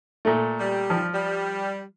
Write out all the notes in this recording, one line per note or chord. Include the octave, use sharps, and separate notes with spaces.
A#2 A3
G3
F3
G3